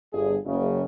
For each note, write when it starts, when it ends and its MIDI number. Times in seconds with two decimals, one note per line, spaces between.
0.12 0.36 31
0.12 0.36 43
0.12 0.36 68
0.46 0.83 30
0.46 0.83 49